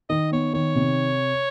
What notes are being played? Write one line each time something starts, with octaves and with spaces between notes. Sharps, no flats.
D#3 D#5
B3 C#5
D#3 C#5
C3